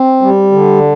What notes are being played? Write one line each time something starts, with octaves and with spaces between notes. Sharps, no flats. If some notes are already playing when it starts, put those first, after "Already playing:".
Already playing: C4
G3
D3